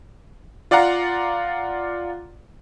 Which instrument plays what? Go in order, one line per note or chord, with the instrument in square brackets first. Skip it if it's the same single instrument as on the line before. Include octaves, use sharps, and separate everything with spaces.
[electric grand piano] F4 D5 F5 F#5 A#5